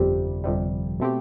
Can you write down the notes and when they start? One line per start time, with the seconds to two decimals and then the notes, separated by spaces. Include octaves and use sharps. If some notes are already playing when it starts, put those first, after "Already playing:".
Already playing: G1 F2 C3 G3
0.44 G1 F2 C3 G3
1.00 B2 A3 C4 G4